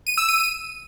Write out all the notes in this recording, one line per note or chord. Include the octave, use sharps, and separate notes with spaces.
D#7
E6
D#7